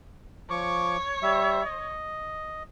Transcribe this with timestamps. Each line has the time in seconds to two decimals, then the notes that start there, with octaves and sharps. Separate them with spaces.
0.50 F3 C#5 C#6 D6
1.23 G3 E5
1.65 D#5